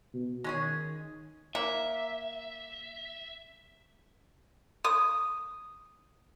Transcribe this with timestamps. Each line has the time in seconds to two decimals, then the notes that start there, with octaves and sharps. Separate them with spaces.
0.14 B2
0.44 D#3 G#3 C#4 G#4
1.55 A#3 E5
4.85 D#6